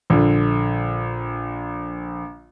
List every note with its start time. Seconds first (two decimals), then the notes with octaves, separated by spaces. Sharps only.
0.10 A#1 D3